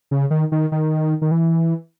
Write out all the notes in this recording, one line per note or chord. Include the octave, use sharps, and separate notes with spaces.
C#3
D#3
D#3
D#3
D#3
E3